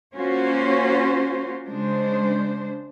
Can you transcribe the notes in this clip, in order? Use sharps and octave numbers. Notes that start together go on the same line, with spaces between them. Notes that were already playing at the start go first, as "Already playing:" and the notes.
A#3 C#4 F4 F#4 C5
C#3 G#3 D4 C5